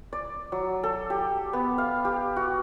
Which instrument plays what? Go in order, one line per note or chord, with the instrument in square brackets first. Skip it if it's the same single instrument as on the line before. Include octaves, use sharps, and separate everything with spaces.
[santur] D5
F#3
A4
G4
B3
F5
G4
F#4